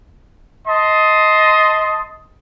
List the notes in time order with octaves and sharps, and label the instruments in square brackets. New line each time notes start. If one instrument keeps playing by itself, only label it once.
[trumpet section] D#5 A5 C6 D#6